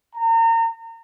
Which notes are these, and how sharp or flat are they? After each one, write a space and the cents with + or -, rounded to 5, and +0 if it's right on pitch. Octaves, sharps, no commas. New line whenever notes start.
A#5 -35